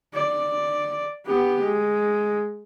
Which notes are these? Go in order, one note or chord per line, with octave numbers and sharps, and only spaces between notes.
D5
B3 G4
G#3